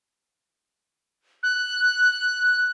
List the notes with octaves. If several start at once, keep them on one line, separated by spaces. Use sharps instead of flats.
F#6